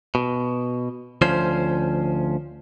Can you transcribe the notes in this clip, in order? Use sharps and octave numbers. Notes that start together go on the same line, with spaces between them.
B2
D2 F3 C#4 C5